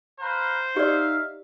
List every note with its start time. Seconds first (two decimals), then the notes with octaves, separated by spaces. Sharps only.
0.20 B4 C5 F5 A#5
0.77 D#4 G4 D5 E5 F5